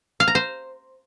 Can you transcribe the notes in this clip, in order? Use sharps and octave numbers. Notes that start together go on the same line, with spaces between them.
F5
A#5
C5